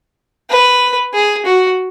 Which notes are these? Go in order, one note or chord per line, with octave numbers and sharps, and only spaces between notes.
B4
G#4
F#4